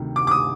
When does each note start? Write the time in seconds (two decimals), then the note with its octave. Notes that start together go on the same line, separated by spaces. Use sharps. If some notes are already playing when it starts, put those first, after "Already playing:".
Already playing: D2 C3 D#3
0.16 D6
0.27 D6
0.31 D#6